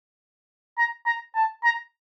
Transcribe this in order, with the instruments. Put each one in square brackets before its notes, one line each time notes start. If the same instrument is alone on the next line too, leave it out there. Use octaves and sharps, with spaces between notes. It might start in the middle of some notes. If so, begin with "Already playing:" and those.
[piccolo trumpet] A#5
A#5
A5
A#5